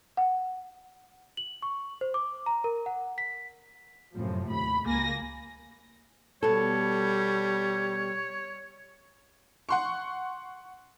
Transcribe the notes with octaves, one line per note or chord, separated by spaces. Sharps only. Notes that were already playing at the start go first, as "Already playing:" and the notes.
F#5
F#7
C#6
C5
D6
A#5
A#4
F#5
B6
F#2 A2 C3 F3
D#2 B5
C#2 A#3 G#5 A#6
B2 G3 A4 C#5
F#5 C6 C#6